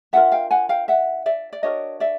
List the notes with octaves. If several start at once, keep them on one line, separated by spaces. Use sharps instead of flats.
D4 F4 A#4 E5 F#5
F5 G5
F#5 G#5
F5 G5
E5 F#5
D5 E5
D5
D4 F#4 A#4 C#5 D#5
D5 E5